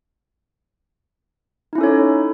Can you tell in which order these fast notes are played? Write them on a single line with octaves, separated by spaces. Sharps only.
D#4 E4 C#4 A4 C#5